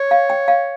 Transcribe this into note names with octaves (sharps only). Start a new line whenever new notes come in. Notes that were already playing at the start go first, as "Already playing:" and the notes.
Already playing: C#5
F5
G5
F5